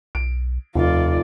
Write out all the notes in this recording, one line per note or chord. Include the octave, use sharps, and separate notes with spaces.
B1 D7
F1 D#2 F4 D5